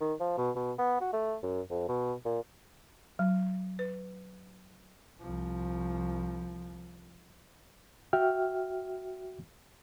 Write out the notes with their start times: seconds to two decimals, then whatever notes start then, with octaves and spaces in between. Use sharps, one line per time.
0.01 D#3
0.20 F3
0.37 B2
0.55 B2
0.78 B3
1.01 F#4
1.13 A3
1.43 F#2
1.70 F2
1.88 B2
2.25 A#2
3.19 F#3
3.79 B4
5.20 C2 F3
8.13 F#4 E5 G5 F6